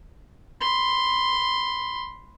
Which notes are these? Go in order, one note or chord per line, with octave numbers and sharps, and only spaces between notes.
B5 C6